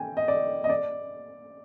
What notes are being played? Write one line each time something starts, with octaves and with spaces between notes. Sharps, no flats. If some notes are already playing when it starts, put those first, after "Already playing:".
Already playing: G5 G#5
D#5
D5
D#5
D5